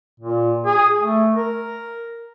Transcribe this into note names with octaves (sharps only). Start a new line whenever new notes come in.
A#2
G#4
A3
A#4